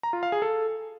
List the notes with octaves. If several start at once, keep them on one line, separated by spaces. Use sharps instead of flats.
A#5
F4
F5
G#4
A4